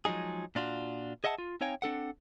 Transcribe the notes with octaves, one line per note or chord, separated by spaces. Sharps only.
F3 F#3 G#3 D#4 G#4
A#2 D4 F4 F#4
G#4 D#5 E5 F#5 G#5 A5
F4
C4 D#4 C#5 F5 G5 G#5
C4 D4 A4 F#5